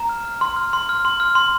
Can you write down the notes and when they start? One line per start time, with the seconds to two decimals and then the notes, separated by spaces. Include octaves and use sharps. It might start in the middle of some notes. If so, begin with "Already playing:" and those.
Already playing: A#5
0.09 F6
0.25 F6
0.41 C6
0.56 F6
0.73 C6
0.89 F6
1.05 C6
1.20 F6
1.35 C6